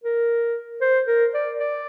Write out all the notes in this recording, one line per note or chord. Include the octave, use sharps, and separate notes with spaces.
A#4
C5
A#4
D5
D5